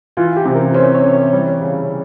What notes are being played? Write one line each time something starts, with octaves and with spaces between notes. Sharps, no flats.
E3 F4
G4
C3
A#4
C#4 C5
C#5
E3
C#5
G3
C#3